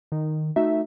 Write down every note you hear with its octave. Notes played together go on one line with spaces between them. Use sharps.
D#3
A3 D#4 F#4 E5